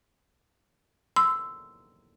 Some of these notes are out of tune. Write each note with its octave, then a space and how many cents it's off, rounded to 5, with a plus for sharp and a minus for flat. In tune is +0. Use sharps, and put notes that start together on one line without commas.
C6 -20 E6 +0